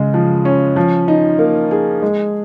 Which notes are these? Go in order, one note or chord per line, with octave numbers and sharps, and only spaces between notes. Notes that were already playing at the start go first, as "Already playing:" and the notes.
Already playing: C#3 G#3
F3
C#4
F3
D#4
A#3
G#4
G#3